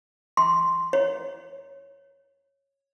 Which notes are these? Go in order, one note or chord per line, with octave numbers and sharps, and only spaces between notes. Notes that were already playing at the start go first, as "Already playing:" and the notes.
C6
C#5